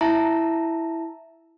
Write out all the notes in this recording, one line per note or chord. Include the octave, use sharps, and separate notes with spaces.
E4 E5 A5 A#5